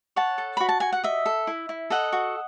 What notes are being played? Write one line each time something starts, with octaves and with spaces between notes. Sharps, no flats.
C#5 F#5 A5
A4
F#4 B5
A5
F#4 G#5
F#5
D#5 E5
A4
E4
E4
A4 D#5 F#5
F#4